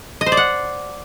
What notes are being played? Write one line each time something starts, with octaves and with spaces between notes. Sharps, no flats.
D#5
C5
D5
F#5